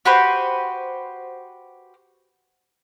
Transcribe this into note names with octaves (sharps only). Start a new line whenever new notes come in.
F#4 G4 B4 C5